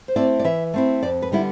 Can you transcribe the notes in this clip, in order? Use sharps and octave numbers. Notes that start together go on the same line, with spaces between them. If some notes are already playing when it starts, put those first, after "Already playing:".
C5
A3 C4 E4 D5
D5
E3 E5
A3 C4 E4
F2 D5
B4
D3 G3 B3 E4